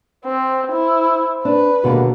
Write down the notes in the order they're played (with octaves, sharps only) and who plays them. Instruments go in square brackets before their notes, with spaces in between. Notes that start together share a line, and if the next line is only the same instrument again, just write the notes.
[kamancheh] C4 [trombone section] C5
[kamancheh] E4
[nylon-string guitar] D4 [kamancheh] B4
[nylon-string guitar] D#2 B2 D3 [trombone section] G3 G#3 A#3